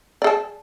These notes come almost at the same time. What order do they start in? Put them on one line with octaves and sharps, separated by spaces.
D5 G#4 A5